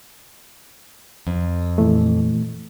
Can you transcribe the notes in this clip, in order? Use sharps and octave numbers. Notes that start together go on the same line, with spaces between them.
F2
A#2 E3 A3